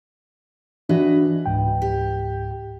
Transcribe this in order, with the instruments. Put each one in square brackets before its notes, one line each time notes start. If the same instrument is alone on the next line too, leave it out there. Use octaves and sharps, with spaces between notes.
[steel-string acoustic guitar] E3 B4 D#5 [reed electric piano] D4 F#4
[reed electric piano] C#2 G#2 G5
[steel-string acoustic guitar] G4